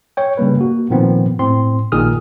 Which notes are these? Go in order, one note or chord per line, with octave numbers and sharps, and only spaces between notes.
C#5 G5
C#3 G3 A#3 B4
A#3 F#4
A#2 D#3 F3 B3 C4
A2 C4 C6
A#1 A#2 D#3 G#4 D#6 F6